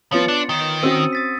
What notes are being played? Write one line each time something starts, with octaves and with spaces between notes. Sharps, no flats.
F3 B3 F4 C#5 A6 C#7
D4
D#3
C4 C#4 F#4 D#6 E6 D#7
D#6 A6 B6